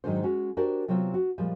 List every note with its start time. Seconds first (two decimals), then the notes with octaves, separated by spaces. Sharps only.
0.04 G#2 D#3 F#3 G#3 D4 C5
0.23 G#3 C#4 F#4
0.57 D4 F#4 G4 A#4 C5 D5
0.88 C3 F#3 B3 C4 F4
1.14 F#4
1.38 A#2 F3 G3 G#3